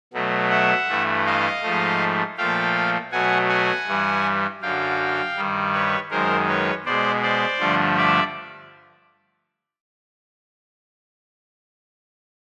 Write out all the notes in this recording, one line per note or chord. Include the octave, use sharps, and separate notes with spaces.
B2 F#3 A3
E5 F#5
G2 E3 A3
D#5 F5
G#2 F3 A3
A#2 F3 A3 F5 G5
B2 F#3 A3 F#5 G#5
F#5 G#5
G2 E3 G3
F#2 D3 F#3 F5 G5
G2 D#3 G3
B4 C#5
F#2 D#3 G#3 A#4 C5
B4 C#5
B2 G#3 C5 D5
C5 D5
G2 D3 F3 A3
D5 E5